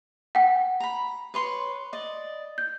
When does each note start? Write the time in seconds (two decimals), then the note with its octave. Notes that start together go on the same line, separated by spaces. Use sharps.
0.35 F#5 G5
0.80 A#5 B5
1.34 B4 C#5 C6
1.93 D5 D#5
2.58 G6